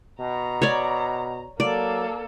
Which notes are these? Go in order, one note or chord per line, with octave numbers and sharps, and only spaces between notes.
B2 A#5
C#5 D5
F#3 A#3 A4 D5